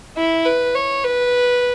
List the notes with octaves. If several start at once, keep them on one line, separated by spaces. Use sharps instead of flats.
E4
B4
C#5
B4